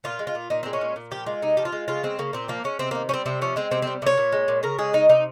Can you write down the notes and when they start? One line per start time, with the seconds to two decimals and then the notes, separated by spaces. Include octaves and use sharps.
0.04 A#2 F4
0.19 G#3
0.27 F4
0.35 A#2
0.50 A#2 D#4
0.63 G#3 C4
0.73 C#4
0.81 A#2
0.96 A#2
1.11 F3 G4
1.26 G#3 F4
1.42 C3 D#4
1.57 F3 G4
1.65 F4
1.72 G#3
1.88 C#3 F4
2.03 G#3 C4
2.19 C#3 A#3
2.33 A#2 C4
2.48 F3 A#3
2.64 G#3 C#4
2.79 C3 C4
2.91 D#3 A#3
3.09 G3 C4 C#4
3.26 C3 C4
3.41 F3 C#4
3.56 G#3 C4
3.71 C3 C4
3.82 G3 C4
4.02 C3 C#5
4.17 A#2
4.32 G#3
4.48 A#2
4.63 C#3 A#4
4.78 G#3 G#4
4.93 C#3 D#4
5.09 C3 D#4